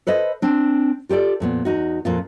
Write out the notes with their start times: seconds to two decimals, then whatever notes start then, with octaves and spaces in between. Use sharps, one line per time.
0.07 A4 B4 C5 D#5
0.42 C4 D4
1.09 F4 G4 A4 D5
1.40 F2 A#2 B3
1.65 E2 D#4 F#4
2.05 F2 A#2 F4